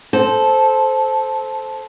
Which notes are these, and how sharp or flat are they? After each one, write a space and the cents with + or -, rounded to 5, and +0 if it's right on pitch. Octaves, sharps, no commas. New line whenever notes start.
A4 -15 C5 +0